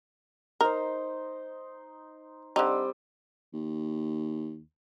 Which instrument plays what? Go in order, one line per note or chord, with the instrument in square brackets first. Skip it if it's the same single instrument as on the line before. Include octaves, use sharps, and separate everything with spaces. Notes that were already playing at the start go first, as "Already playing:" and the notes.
[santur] D#4 C5 [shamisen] A#4
[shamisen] D3 D#4 [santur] G3 C4
[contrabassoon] D#2